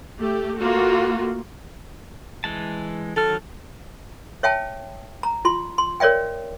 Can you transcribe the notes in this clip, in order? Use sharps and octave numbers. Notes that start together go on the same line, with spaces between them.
A3 G4
A3 A#3 F4 F#4
E3 G#3 A5
D#3 F#3 A4 F6
C#5 E5 G5 A5
A#5
F4 C6
C6
A#4 C#5 D5 E5 G5